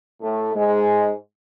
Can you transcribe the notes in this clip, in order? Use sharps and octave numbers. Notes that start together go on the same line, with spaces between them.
A2 A3
G#2 G#3